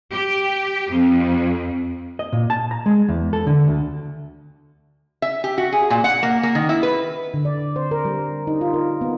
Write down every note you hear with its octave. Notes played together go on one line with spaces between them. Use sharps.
G4
F2
D#5
A#2
A5
A#5
G#3
E2
A4
D3
D2
E5
G4
F#4
G#4
A#2
F#5
A#3
A#3
D#3
E4
B4
D3
D5
C5
A#4
G3
D#4
F4
A#4
B3